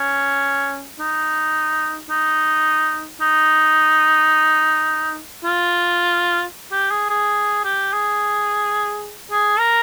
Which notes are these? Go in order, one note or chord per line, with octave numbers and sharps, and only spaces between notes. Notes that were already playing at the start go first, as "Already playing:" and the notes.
Already playing: C#4
D#4
D#4
D#4
F4
G4
G#4
G#4
G4
G#4
G#4
A#4